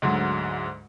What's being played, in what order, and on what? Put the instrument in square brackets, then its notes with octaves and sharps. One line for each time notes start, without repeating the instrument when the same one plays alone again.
[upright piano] D2 G#2 D3 F#3